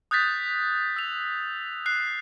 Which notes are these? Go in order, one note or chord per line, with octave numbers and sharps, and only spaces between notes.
D#6 F#6 G6 A6 B6
E6 F7
F#6 C7